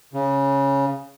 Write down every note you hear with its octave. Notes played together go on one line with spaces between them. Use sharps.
C#3